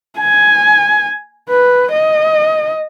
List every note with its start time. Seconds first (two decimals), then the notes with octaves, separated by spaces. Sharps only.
0.20 G#5
1.49 B4
1.92 D#5